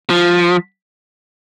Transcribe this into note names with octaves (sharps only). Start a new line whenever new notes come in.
F3